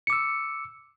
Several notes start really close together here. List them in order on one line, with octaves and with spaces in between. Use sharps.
C#7 D6 E6